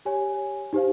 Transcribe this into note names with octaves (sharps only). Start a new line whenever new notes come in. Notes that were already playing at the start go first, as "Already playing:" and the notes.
G4 C#5 G#5
D#4 G4 C5 F5